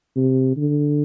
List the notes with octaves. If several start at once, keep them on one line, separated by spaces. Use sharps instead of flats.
C3
D3